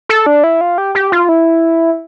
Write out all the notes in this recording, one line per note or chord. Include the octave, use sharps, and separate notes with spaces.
A4
D4
E4
F4
G4
G4
F4
E4